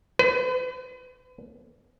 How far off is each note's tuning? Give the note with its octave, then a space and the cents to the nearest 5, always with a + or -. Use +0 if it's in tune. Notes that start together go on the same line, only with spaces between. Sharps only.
B4 +40